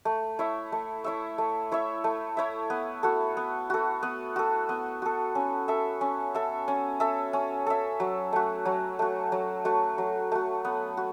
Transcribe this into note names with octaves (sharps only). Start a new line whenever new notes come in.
A3
E4 C#5 E5
A3
E4 C#5 E5
A3
E4 C#5 E5
A3
E4 C#5 E5
B3
F#4 A4
B3
F#4 A4
B3
F#4 A4
B3
F#4 A4
C#4
A4 E5
C#4
A4 E5
C#4
A4 E5
C#4
A4 E5
F#3
A3 F#4
F#3
A3 F#4
F#3
A3 F#4
F#3
A3 F#4
B3
F#4